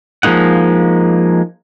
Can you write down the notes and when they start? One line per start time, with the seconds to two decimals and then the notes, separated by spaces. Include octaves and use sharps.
0.23 F3 G#3 A#3 D#4 F#5